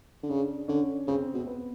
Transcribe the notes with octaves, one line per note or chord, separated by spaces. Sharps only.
D3
C#3 D4
D3 C#4
C#3 C4
B2
C4
B3